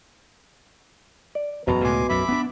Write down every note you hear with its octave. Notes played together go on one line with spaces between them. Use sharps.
D5
E1 F#2 B2 A#5
C#2 A2 G#3 G#5 C6 D6
B1 F#2 E5 B5 D6
B3 C#4 D4